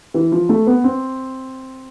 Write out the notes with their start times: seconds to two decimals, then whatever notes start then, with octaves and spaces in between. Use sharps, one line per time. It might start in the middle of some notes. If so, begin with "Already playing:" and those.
0.14 E3
0.32 F3
0.49 A3
0.67 B3
0.84 C4